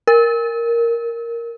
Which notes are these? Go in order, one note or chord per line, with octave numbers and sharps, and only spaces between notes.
A#4